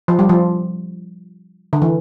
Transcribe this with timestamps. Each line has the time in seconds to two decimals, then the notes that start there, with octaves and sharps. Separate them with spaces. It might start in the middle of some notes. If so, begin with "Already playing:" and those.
0.08 F3
0.19 G3
0.29 F3
1.73 D3
1.82 E3